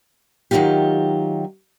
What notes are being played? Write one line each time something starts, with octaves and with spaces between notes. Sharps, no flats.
D#3 F#3 G3 D#4 F4 G4